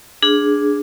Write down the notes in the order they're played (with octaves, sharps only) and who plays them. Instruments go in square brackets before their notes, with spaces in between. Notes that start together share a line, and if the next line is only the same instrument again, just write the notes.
[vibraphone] D4 G#4